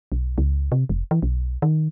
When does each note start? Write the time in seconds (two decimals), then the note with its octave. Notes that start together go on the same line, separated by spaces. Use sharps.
0.12 B1
0.38 C#2
0.72 C3
0.89 F1
1.11 E3
1.22 B1
1.62 D#3